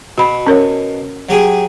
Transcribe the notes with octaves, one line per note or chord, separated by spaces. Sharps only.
B2 F#4 B5
C#4 A#4 C#5
F#3 G4 G#4